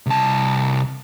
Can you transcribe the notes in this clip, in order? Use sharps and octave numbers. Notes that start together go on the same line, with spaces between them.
C2 A5